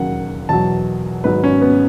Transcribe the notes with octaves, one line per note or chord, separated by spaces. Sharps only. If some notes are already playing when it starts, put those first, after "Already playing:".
Already playing: E1 D#2 C#3 F#3 F#5
E2 B2 F#3 A5
G#1 G#2 F#3 B4
C#4
B3